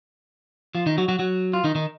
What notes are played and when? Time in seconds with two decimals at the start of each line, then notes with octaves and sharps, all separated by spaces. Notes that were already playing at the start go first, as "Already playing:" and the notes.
0.75 F3 F4
0.86 D#3 D#4
0.98 F#3 F#4
1.08 F#3 F#4
1.19 F#3 F#4
1.53 F4
1.64 D#3 D#4
1.75 D#3 D#4